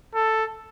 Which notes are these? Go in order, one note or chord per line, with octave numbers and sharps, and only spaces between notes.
A4